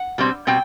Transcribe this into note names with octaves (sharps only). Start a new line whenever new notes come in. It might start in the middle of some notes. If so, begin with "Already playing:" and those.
Already playing: F#5
B2 G3 C4
B2 G3 C4 G5